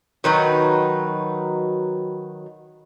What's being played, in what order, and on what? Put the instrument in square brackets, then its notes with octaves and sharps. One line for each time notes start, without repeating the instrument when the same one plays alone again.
[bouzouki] D#3 F#3 D#4 B4